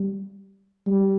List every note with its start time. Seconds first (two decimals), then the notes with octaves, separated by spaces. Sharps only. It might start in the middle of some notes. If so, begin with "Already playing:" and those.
Already playing: G3
0.87 G3